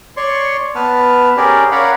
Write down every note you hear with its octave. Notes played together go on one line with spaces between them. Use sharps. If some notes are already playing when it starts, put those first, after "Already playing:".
C#5 D5 C6 C#6
B3 B4 A5 F6
C#4 G4 G#4 A#4 D5
A#4 C#5 D5 F5 F#5 B5